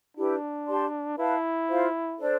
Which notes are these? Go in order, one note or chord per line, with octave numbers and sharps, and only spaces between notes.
D4 E4 G4 B4
G4 D5 A5 C6
E4 B4 F5 A5
F4 C5 F5
D4 A4 C5